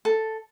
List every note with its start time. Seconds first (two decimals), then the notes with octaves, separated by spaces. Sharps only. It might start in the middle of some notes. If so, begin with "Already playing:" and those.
0.05 A4